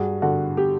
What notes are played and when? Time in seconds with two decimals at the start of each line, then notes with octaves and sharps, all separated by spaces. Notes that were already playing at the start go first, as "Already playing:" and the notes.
Already playing: G2 F#4 G#4
0.22 D3 F#4
0.57 G4